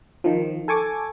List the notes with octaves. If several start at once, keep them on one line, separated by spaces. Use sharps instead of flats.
D#3 F3
A4 G#5 C#6 D6